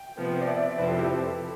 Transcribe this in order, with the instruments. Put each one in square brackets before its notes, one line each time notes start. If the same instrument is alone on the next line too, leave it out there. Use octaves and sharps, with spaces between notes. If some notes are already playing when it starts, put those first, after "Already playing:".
Already playing: [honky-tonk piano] G5
[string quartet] C3 F3 B3
[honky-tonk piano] D5
E5
D5
[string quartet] F2 C3 F3 C4 E4 [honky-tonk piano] B4
[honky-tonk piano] A4
G4